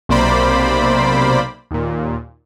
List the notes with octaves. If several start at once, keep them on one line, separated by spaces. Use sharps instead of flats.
B1 C3 A#3 C5 D5 B5
D#2 A#2